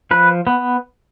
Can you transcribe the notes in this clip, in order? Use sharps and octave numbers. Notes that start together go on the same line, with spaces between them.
F3 B4
B3